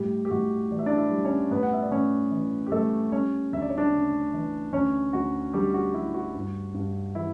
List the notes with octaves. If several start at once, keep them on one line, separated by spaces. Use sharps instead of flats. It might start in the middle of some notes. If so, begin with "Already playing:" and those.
Already playing: A2 G3 G4
G4
A2 F#4
E3 D5
E5
D4 D5
E4 E5
G3
C#4 C#5
A2 B3 B4
F#5
E5
D5
A2 C#4 C#5
E3
G4
G3 A3 A4
G3 C#4 C#5
D2 E5
D5
C#5
D4 D5
C#3
E3
D2 C#4 C#5
D2 F#4
D3 G3 G4
F#4
G3 E4
F#4
G2
G2
E3 E4